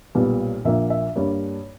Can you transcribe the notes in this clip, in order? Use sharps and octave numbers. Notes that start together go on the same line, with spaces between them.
B1 A#2 G3 B3
A#1 A#2 A#3 E5
E5
G2 G3 A#3 C#5